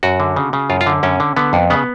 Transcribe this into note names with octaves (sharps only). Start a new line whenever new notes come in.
F#2 F#4
D3
C#3
C#3
F#2 F4
F4
D3
F#2 C#4
D3
D3 B3
F2
C#3 B3